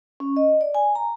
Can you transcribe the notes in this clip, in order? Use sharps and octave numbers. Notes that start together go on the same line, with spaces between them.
C#4
D#5
D5
G#5
A#5